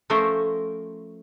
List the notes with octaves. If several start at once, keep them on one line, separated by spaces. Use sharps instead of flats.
F3 A3 C#4 A#4 C5